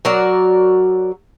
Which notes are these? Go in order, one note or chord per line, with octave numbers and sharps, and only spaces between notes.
F#3 F#4 A#4 D5